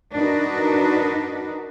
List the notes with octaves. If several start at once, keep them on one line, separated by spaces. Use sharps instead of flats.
D4 D#4 F#4 A#4 B4